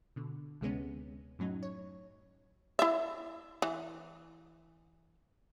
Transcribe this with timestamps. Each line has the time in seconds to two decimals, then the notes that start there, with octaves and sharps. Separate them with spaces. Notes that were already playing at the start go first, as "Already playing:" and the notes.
0.16 B2 D3
0.61 D2 C3 G#3 B3 C#4
1.39 F#2 A2 F#3 C#4 D#4
1.63 C#5
2.79 E4 E5
3.62 E3